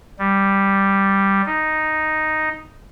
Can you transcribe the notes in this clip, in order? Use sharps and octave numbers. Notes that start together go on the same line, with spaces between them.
G3
D#4